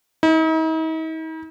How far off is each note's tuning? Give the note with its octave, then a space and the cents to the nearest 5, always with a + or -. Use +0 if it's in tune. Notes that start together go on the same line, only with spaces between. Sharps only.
D#4 +45